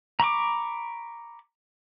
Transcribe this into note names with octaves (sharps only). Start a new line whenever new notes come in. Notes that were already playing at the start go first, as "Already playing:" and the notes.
A#5 B5 C#6 D6